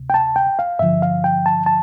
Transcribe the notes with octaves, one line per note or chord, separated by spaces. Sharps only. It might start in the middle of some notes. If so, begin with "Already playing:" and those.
Already playing: D2 C3
G5
A5
G5
F5
G2 D3 F3 E5
F5
G5
A5
A5